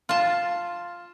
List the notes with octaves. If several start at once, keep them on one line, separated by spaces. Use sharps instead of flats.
F4 A5